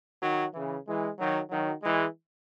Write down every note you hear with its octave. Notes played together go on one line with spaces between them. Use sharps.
D#3 F#3
C#3 E3
E3 G#3
D#3 F#3
D#3 F#3
E3 G#3